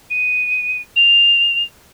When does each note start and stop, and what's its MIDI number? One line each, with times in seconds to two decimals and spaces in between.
0.10 0.80 99
0.96 1.63 101